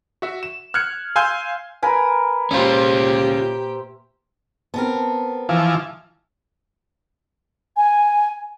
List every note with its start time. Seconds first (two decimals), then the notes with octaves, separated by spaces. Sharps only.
0.22 F#4 E5
0.43 E7
0.74 F6 F#6 G#6 C#7
1.16 F5 G#5 C6 E6 G6
1.83 A#4 B4 G#5
2.51 A#2 C#4 F4 G4 C5 E5
4.74 B3 C4 A#4 A5
5.49 E3 F3
7.77 G#5